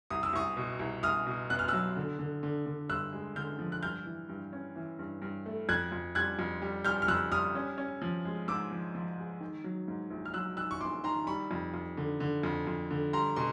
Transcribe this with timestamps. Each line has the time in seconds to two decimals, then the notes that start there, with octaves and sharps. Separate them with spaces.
0.10 C2 D#6
0.23 E6
0.33 C2 C#6 D#6
0.57 B2
0.79 C2
1.03 C2 D#6 F6
1.27 B2
1.50 B3 F#6
1.59 F6
1.68 F#3 E6 F#6
1.97 D3
2.19 D3
2.43 D3
2.66 D3
2.89 G2 E6 F#6
3.13 G#3
3.36 D3 F6 G6
3.59 F3
3.72 F#6
3.82 G2 F6 G6
4.06 E3
4.29 G2
4.53 C#4
4.76 E3
4.99 G2
5.22 G2
5.46 A3
5.69 F2 F#6 G#6
5.92 F2
6.15 G3 F#6 G#6
6.39 F2
6.62 G3
6.85 G3 F6 G6
7.02 F6
7.08 F2 E6 F#6
7.32 G3 D#6 F6
7.55 C#4
7.78 C#4
8.02 F3
8.25 G#3
8.48 G#2 D6 E6
8.71 F3
8.95 F3
9.18 G#3
9.41 D#3
9.64 F#3
9.88 G#2
10.10 A#1
10.25 F6
10.34 F#3 E6 F#6
10.57 D#3 E6 F#6
10.71 C#6
10.81 A#1 C6 D6
11.04 D#3 A#5 C6
11.27 G3 B5 C#6
11.51 F2
11.74 F2
11.97 D3
12.20 D3
12.43 F2
12.67 F2
12.91 D3
13.13 G3 A#5 C6
13.36 B2 C6